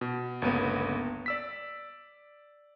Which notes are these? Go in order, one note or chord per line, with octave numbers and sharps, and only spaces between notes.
B2
G1 C#2 A#3 B3
D5 E6 B6